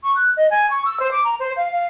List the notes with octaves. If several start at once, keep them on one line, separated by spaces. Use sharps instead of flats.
C#6
F#6
D#5
G#5
C#6
E6
C5
D6
A#5
C5
F5
F5